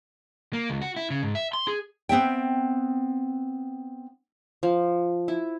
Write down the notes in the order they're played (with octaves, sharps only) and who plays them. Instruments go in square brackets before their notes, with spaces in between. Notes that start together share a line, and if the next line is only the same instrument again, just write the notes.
[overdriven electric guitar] A#3
C#2
F#4
E4
C#3
G#2
E5
C6
G#4
[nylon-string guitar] B3 C4 E5 G5
[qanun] F3
E4